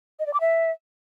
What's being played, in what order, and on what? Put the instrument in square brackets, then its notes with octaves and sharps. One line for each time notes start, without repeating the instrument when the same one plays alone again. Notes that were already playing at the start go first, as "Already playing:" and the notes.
[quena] D#5
D5
D6
E5